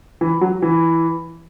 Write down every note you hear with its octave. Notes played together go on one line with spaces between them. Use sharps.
E3
F#3
E3